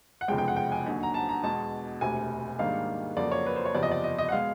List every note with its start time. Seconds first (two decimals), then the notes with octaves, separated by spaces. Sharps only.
0.21 F#5
0.28 F1 E2 C#3 F3 G#3 G5
0.38 G5
0.48 F#5
0.56 G5
0.72 G#5
0.86 D#2 D3 F#3
1.03 A#5
1.14 A5
1.29 A#5
1.43 E2 B2 G#3 A5
2.01 E1 D2 C3 G#5
2.59 G#2 D#3 G3 A#3 D4 F5
3.17 F2 C#3 F#3 A#3 D5
3.32 C#5
3.46 B4
3.56 C5
3.65 C#5
3.75 F#1 E2 C3 F3 D5
3.83 D#5
3.91 D5
4.04 D#5
4.18 D#5
4.29 F#5
4.32 B2 G#3 F5